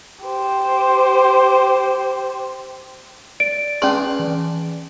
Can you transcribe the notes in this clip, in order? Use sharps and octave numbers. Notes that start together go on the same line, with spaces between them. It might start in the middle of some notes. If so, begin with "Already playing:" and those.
G4 C5
D5 D7
C#4 D4 G#4 B4 F5 C6
E3